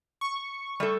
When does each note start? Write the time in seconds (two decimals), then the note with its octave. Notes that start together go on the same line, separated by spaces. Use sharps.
0.21 C#6
0.80 G3 A3 A4